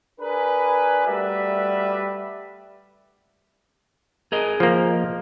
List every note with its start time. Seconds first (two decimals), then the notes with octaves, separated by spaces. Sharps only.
0.21 D4 G#4 A#4 B4
1.06 G3 A3 F#4 B4 D5 E5
4.32 G#4 A#4 D#5
4.60 F3 A#3